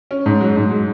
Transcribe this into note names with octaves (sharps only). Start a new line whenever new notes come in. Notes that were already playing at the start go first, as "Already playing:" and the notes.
C#4
G#2
F#3
G#2
G#3